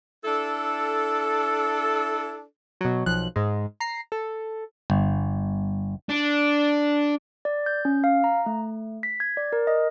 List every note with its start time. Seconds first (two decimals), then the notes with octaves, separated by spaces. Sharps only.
0.25 D4 E4 A4
2.81 B2 F#3
3.06 B1 F3 F#6
3.36 G#2 G#3
3.80 A#5 C7
4.12 A4
4.90 G1
6.09 D4
7.45 D5
7.66 G6
7.85 C#4
8.04 F5
8.24 A#5
8.46 A3
9.03 B6
9.20 G#6
9.37 D5
9.53 A#4
9.67 D#5